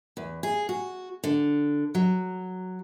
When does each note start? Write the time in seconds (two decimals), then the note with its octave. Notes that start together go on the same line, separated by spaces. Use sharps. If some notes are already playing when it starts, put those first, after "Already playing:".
0.17 E2
0.43 G#4
0.69 F#4
1.24 D3
1.95 F#3